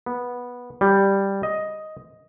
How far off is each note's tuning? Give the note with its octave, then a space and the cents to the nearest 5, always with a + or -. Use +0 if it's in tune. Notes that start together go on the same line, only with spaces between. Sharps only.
B3 -10
G3 +5
D#5 +5